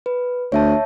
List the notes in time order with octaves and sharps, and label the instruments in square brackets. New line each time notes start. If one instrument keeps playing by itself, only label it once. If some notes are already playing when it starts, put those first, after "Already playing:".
[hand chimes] B4
[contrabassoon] D2 [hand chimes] C#5 E5 A5